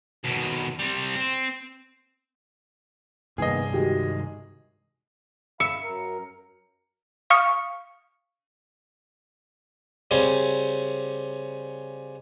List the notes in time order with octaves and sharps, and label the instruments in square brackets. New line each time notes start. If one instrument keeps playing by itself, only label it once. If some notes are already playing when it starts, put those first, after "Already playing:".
[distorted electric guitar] D#2 B2
G3 C4
C4
[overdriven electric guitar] C2 G2 [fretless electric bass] A#2 D#3 B3 [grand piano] G#4 D#5
[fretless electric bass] D#3 G#3 [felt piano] F#4 G4
[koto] E5 [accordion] F5 B5 [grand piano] C#7
[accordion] F#2 A#4
[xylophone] F5 C#6 D#6 F6 C#7
[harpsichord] C#3 G3 C4 C#4